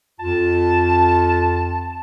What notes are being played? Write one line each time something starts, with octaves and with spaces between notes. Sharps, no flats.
F2 F4 A5